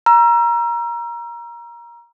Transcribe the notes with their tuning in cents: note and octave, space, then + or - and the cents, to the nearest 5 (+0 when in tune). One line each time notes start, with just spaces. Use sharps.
A#5 +20 E6 +40